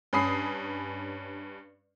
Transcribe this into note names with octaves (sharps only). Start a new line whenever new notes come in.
G2 C#4 B5 D#6 C7